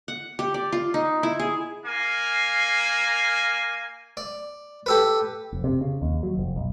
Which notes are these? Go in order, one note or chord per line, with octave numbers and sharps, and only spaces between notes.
F#5
G4
D5
F4
D#4
E4
G#4
A#3 F5 G#5
D5
G4 A4 B4
F1
C3
C#3
D#2
F#3
F1
B1